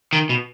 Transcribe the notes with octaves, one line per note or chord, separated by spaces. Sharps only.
D#3
B2